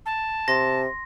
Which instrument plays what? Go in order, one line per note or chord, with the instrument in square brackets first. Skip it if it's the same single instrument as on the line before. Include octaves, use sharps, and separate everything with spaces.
[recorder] A5
[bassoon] C3 [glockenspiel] C6 A#6